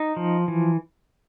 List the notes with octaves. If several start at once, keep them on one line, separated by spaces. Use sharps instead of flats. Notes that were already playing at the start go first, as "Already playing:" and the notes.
Already playing: D#4
F3
E3